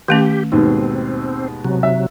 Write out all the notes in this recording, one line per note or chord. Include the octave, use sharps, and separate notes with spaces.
D#3 A3 C#4 G4
D#2 G#2 B2 C4
C3 F#3
E5